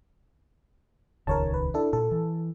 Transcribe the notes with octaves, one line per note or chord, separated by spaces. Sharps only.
D#1 C#2 D#3 A#4 C#5 A5
B4
D4 E4 A4
A#2 A4
E3